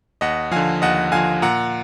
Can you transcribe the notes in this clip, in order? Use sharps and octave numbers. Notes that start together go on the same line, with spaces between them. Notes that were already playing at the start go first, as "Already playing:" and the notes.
D#2 D#5 F#5
D3 F3 F5 G#5
D#2 D#5 F#5
D3 F3 F5 G#5
A#2 F#5 A#5